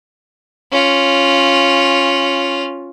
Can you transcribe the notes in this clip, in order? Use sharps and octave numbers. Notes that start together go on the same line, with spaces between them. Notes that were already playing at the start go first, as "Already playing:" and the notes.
C#4 F4